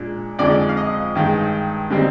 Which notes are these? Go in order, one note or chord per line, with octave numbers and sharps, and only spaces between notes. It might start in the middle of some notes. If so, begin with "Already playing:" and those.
Already playing: A#2 G#3 D4
F2 D3 G#3 D#4 D5
F5
D#5
G2 D#3 G#3
D3 G3 C4 D#4